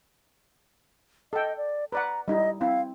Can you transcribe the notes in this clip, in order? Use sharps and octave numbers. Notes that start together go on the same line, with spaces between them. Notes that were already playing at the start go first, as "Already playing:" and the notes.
A4 D#5 G5
D5
B4 D5 F#5 A#5
G3 D#4 E4 D#5
C4 E4 F5